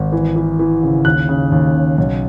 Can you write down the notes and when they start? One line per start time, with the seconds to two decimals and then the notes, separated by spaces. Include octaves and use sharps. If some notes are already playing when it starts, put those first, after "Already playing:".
Already playing: G#1
0.12 E3
0.36 E3
0.59 E3
0.83 C#3
1.05 D#2 F#6
1.29 C#3
1.52 D#2
1.74 C#3
1.98 B1